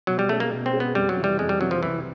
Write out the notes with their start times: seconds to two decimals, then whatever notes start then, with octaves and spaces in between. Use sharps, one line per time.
0.07 B2 F#3
0.19 G3
0.29 G#3 A3 C#4
0.40 A#3
0.51 B2
0.66 C4
0.73 G#3 C#4
0.80 B3
0.95 F2 G3
1.09 F#3
1.17 C3 E3
1.24 G3
1.39 F2 G#3
1.49 G3
1.60 C3 E3 F#3
1.71 F3
1.83 C2 E3